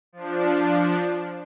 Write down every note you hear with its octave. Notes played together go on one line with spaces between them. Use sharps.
F3 D4